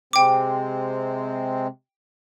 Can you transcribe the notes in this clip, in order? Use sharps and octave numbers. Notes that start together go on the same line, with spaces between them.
C3 G#3 C4 G5 D6